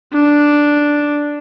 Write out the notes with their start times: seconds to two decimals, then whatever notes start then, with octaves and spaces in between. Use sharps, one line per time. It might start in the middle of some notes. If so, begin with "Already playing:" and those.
0.14 D4